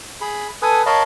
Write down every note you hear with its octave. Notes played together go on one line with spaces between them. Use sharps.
G#4 B5
A4 B4 G#5 D#6
A#4 C#5 D#5 F5 A5 B5